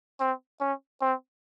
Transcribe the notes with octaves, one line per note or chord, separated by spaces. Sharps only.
C4
C#4
C4